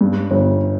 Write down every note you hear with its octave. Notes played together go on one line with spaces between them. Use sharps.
G2
G1